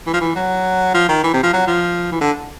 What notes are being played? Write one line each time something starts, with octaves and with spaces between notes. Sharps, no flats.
E3
F3
E3
F#3
F3
D#3
E3
C3
F3
F#3
F3
E3
D3